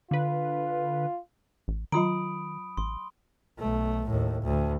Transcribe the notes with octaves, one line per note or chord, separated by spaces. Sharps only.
D3 F4 B4
A1
D#3 F#3 F4 A#5 B5 D#6 D7
A1 C6
B1 A3
D#2 A2
D2